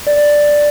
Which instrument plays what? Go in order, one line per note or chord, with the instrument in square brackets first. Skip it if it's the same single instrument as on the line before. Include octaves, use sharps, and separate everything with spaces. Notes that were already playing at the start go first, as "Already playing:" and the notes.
[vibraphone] D5